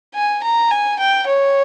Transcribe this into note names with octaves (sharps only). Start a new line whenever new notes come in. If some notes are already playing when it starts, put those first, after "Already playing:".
G#5
A#5
G#5
G5
C#5